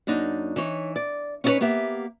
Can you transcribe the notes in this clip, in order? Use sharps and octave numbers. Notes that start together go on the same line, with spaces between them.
F#2 A#3 D4 D#4
E3 D#4 C#5
D5
C#4 D#4 E4 G4 B4 C#5
A#3 B3 G4 E5